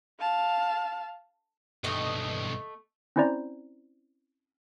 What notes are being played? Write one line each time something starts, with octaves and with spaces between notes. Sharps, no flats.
F5 A5
B1 G2 A3 D#5
C4 C#4 E4 C5 D5 A#5